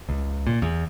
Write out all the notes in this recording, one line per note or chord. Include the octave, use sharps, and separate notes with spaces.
C#2
A#2
E2